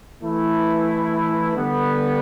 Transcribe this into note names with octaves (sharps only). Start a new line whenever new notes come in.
E3 A3 E4
D3 G3 B3